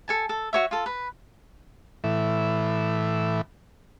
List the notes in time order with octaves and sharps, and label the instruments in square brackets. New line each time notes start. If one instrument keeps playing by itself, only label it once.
[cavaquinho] A4 G#5 A5
A4
F#4 C#5 E5
F4 A4
B4
[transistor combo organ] A2 E3